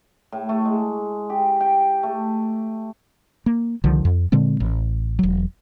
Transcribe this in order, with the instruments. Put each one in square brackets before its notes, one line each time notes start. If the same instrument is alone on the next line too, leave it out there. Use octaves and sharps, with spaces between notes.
[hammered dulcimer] A2
A3
G#3
G4
G5
A3
[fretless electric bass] A#3
C2 D3 D#3 F3
F2
A#2 D3 G#3 C4
A1
E1 F#3